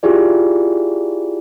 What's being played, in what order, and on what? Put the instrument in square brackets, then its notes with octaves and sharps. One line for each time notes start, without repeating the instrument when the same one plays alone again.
[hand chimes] E4 F4 G4 G#4 D5